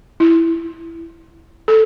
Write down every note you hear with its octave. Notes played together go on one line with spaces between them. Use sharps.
E4
A4